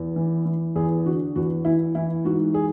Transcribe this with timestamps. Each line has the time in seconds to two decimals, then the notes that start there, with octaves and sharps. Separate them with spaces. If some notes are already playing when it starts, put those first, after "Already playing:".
Already playing: E2
0.16 E3
0.45 E3
0.76 E2 G#4
1.06 D3 F#4
1.36 E2 F#4
1.65 E3 E4
1.95 E3 E4
2.25 G#2 F#4
2.54 G#4